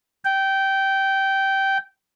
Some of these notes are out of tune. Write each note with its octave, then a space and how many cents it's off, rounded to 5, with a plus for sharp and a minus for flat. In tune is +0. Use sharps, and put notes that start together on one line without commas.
G5 -15